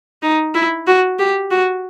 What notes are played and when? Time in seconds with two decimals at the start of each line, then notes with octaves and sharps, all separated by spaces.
0.23 D#4
0.55 E4
0.87 F#4
1.19 G4
1.51 F#4